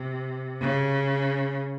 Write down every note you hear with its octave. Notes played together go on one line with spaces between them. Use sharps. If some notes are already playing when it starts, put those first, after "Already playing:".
Already playing: C3
C#3